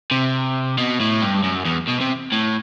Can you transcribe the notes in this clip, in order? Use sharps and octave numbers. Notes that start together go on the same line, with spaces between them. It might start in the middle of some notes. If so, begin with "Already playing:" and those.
C3
B2
A2
G2
F#2
E2
B2
C3
A2